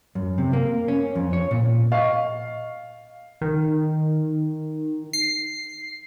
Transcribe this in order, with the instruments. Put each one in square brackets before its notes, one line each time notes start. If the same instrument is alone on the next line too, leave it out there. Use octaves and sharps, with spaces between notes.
[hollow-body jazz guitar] F#2
C3
A#3
C#4
F2
C#5
A#2
[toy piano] D#5 C#6 [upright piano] F5
[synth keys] D#3
C7